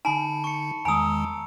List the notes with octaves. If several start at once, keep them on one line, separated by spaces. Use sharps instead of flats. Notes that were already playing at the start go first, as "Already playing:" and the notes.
D3 D#4 G#5 A5 B5
C#6 C#7
E2 D#3 G#3 G#5 A#5 D#6 E6